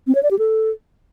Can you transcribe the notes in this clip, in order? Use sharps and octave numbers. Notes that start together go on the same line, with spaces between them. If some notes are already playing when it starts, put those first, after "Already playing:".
C4
C#5
D5
G4
A4